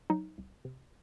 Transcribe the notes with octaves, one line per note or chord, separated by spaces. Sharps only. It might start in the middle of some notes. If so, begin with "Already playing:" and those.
F#3 D#4
C2
C3